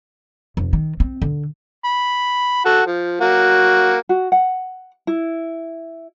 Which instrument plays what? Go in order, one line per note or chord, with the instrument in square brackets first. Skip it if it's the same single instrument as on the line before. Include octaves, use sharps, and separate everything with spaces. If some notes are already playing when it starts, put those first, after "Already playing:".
[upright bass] F1
D#3
C4
D3
[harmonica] B5
F#4 A4
F3
F#3 A#3 F#4
[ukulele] F#4
F#5
E4